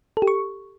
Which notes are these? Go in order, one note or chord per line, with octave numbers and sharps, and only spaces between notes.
A4
G4
C#6